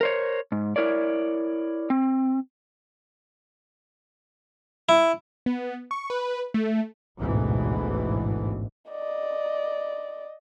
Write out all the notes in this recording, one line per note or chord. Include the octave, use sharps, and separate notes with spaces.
A#4 C5 C#5
G#2
E4 A#4 C#5 D5
C4
E4
B3
C#6
B4
A3
A1 D2 G#2 B2 E3
D5 D#5